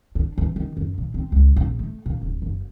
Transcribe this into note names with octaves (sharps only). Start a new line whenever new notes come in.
D4
E3
D#3
F#2
A#2
C4
C#2
A#1
A3
A#2
D#1
F#1